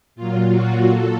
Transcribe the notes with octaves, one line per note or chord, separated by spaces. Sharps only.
A#2 F#3 F4
F#4
A#2 A4